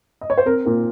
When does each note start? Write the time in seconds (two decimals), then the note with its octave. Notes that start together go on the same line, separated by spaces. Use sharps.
0.21 D#5
0.30 C#5
0.38 C5
0.46 C4 A#4
0.65 A#2 A#4